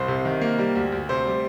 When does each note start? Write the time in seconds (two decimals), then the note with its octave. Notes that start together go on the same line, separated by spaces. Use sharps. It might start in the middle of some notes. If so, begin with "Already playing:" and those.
Already playing: C2 C5
0.08 C3
0.25 D#3
0.41 A#3
0.59 G3
0.75 D2
0.92 D2
1.09 C3 C5
1.26 G3